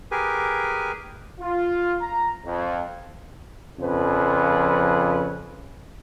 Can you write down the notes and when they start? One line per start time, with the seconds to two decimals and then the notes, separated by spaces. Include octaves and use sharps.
0.11 G4 G#4 A#4 B4 G#5
1.40 F4
2.01 A#5
2.44 F2
3.80 F2 C#3 F3 B4